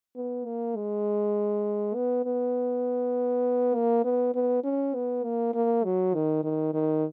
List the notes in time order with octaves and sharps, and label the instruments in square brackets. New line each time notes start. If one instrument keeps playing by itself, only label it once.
[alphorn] B3
A#3
G#3
B3
B3
A#3
B3
B3
C#4
B3
A#3
A#3
F#3
D#3
D#3
D#3